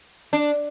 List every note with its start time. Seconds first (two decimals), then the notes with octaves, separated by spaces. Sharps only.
0.33 D4